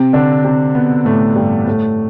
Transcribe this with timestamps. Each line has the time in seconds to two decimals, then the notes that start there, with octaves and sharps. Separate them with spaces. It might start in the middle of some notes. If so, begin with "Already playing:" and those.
Already playing: C3 C4
0.13 D3 D4
0.45 C3 C4
0.75 B2 B3
1.05 A2 A3
1.36 G2 G3
1.67 A2 A3